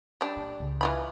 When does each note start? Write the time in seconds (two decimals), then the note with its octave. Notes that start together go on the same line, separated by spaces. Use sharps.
0.21 G3 D4
0.36 A#2
0.60 C#2
0.81 E3 F4 B5